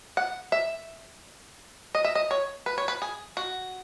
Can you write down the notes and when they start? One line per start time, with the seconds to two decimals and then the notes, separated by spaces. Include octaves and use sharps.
0.17 F#5
0.52 E5
1.95 D#5
2.04 E5
2.15 D#5
2.31 C#5
2.66 B4
2.78 C#5
2.88 B4
3.02 G#4
3.37 F#4